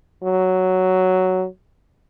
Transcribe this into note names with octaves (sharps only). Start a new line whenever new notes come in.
F#3